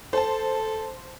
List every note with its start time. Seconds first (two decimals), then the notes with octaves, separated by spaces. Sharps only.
0.13 A4 C5 A5